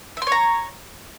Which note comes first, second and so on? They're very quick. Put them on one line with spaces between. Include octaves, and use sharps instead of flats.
E5 C6 C#5 A#5